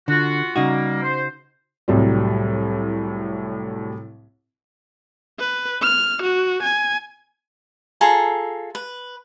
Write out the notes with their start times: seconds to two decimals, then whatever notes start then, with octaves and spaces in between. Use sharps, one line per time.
0.08 D3 F4 F#4
0.56 C#3 G3 A#3 D#4 F#4
1.02 C5
1.88 C2 A2 F#3 G3
5.39 B4
5.82 F6
6.23 F#4
6.63 G#5
8.01 F4 G#4 A4 A#5
8.75 B4